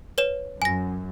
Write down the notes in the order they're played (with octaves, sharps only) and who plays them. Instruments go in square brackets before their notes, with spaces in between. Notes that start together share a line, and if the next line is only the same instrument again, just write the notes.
[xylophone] B4 C#5 E7
[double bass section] F#2 [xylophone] G#5 A#6